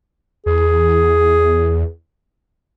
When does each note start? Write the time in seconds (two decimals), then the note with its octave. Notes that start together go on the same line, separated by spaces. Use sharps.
0.46 E2 G#4